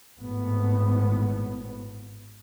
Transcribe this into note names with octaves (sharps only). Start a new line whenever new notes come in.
G#1 A2 B3